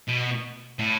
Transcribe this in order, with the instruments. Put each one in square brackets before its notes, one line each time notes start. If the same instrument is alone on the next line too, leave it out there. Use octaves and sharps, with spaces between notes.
[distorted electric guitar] B2
A2